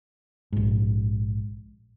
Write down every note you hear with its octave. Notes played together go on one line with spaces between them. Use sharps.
A#1 G#2